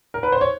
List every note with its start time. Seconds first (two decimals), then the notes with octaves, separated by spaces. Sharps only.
0.14 A#4
0.23 B4
0.32 C5
0.41 C#5